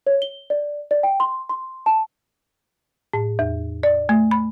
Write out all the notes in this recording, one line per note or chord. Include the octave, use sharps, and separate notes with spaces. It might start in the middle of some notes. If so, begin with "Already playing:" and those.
C#5
G7
D5
D5
G5
C6
C6
A5
A2
E2
D5
A3
B5